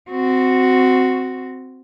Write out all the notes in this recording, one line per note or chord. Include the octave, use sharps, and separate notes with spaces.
C4 F#4